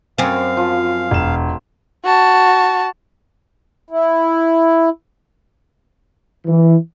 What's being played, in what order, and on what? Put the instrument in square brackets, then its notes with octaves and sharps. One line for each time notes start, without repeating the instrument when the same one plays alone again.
[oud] F#2 C4 [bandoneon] F5 [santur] G#5
[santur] F3
[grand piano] E1 E7
[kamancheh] F#4 A5
[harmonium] E4
[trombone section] E3